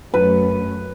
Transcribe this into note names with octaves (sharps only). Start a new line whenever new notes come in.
F#2 A3 C#4 B4